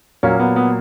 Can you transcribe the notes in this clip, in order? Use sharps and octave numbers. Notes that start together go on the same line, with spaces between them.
A#2 F#3 A#3 C#4
B3
B3